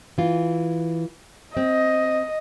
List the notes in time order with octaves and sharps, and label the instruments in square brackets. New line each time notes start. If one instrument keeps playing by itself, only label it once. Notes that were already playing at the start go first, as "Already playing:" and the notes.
[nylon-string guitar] E3 F4
[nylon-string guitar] C4 [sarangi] D#5